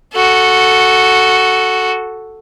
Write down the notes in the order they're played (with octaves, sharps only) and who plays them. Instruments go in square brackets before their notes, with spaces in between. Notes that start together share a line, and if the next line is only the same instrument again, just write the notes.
[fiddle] F#4 A4